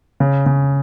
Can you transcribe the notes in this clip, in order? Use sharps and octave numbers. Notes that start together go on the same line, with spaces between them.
C#3
C#3